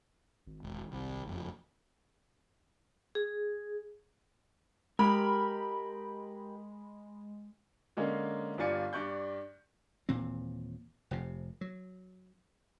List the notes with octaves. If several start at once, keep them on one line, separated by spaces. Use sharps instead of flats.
G#1
E1
C2
F#1 F2
G#4
G#3 G4 A#4 B5
D3 G#3 A#3 C#4 A#4
G1 G2 F4 D5 G#5 C#7
G2 D5 C#6 F#6 G6
D#1 A#2 E3 C4
F1 F2 C3
F#3